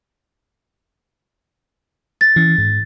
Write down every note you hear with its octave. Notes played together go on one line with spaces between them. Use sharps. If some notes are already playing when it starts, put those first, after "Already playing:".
A6
E3 C#4
G#2